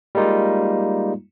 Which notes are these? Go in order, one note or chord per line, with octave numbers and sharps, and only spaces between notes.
G3 G#3 A#3 D#4 F4